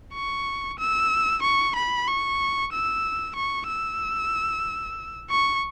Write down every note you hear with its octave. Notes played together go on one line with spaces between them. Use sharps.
C#6
E6
C#6
B5
C#6
E6
C#6
E6
C#6